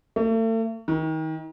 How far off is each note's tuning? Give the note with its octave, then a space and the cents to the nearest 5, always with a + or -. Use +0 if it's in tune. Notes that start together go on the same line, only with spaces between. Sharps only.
A3 +40
D#3 +30